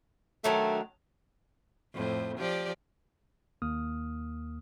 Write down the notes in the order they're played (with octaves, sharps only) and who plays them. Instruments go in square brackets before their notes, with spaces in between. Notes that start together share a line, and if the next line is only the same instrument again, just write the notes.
[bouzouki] D#3 F#3 D4 [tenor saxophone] A3
[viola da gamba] F2 A2 C5
F3 G4 D5
[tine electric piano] D#2 A#3 D#6 F6